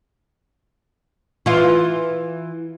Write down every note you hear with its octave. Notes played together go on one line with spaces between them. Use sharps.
E3 F4